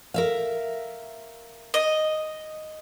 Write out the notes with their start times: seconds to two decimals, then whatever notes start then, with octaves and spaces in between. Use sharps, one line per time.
0.14 A#4 E5 F5
1.74 D#5